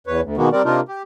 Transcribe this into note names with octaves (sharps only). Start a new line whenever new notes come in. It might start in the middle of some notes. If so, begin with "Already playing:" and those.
E2 B4 C#5
D2
B2 D#3 G#3 A#3 B3 F#4
G3 C4 A#4 D5
C3 A#3 D4 D#4 F4 A#4
G4